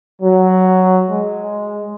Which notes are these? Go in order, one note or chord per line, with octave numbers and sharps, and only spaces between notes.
F#3
G#3